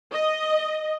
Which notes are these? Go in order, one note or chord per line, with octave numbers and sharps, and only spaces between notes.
D#5